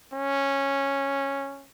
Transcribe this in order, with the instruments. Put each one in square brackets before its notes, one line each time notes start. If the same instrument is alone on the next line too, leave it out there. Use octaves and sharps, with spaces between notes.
[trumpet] C#4